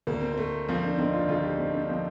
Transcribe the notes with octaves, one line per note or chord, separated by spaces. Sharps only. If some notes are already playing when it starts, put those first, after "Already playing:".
D2 A#3
C4
A3 A#3
F3 C4
A#3 D4
D3 C4 D#4
D4 F4
D2 F4 A4
D#4 G4
A3 C4 D#4
A#3 D4
F3 C4